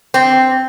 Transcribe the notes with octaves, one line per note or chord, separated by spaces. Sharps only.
C4